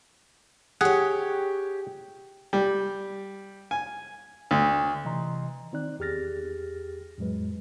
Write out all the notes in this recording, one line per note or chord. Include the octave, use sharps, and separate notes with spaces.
G4 G#4 C#5 F#5
G3
G#5
D2
C3 E3 D#5 A#5 C6
D#3 C4 D#4 D5 F#6
E2 G4 G#4 F6 A6 A#6
F2 A2 F#3 G#3 B4